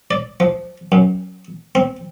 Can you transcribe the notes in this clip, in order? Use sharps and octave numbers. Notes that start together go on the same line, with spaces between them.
D5
F3
F#2
C4